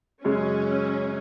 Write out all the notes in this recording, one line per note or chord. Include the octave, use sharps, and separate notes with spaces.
F#2 C#3 G#3 C#4